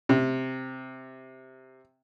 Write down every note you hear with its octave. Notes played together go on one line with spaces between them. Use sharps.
C3